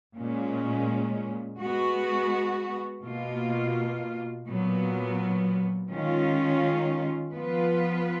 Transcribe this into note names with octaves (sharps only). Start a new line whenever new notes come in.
A#2 G#3 C#4
G#3 B3 F#4
B2 A#3 F4
A#2 F#3 B3
D#3 G#3 C#4 F4
F3 B3 F4 B4